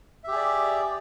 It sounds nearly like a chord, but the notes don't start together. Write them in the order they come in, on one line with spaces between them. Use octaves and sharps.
E5 G4 G#4 D5